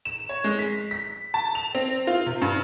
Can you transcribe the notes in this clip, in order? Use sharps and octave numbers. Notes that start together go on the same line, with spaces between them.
E7
C#5
G#3
B6
B6
A5
F7
C4
F4
C3
G2